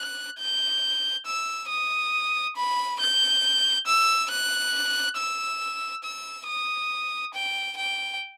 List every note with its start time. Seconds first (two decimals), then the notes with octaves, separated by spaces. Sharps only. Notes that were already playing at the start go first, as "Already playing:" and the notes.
Already playing: F#6
0.38 G6
1.26 E6
1.69 D#6
2.56 B5
3.00 G6
3.86 E6
4.30 F#6
5.17 E6
6.03 E6
6.47 D#6
7.34 G5
7.77 G5